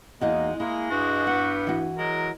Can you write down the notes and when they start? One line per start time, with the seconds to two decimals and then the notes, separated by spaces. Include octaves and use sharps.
0.21 E2 G#3 A#3 D#4 F#4
0.60 G#3 A#3 E4
0.91 G2 F#4
1.27 B3 F#5
1.67 E3 F#4
1.98 F#3 G#3 A#4